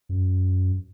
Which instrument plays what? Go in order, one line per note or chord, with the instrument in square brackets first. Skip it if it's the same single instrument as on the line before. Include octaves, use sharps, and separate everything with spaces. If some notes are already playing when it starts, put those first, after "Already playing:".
[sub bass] F#2